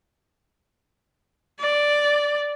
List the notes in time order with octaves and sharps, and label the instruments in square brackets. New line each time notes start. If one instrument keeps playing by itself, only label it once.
[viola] D5